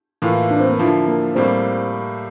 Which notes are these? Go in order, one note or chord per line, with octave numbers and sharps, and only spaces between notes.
A2 E3 A#3 F4
D4
C4
A#3
D3 F3 A#3 E4
A#3
A2 G3 A#3 C4